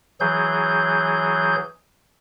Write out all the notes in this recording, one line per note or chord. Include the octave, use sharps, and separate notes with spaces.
E3 F#3 G#4 G6